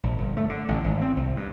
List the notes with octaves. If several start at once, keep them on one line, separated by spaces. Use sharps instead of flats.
A#1
G1
A3
D3
A1
G#1
C4
C2
G2